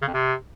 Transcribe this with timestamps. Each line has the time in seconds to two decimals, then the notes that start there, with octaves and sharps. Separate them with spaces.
0.02 C#3
0.08 F2
0.14 C3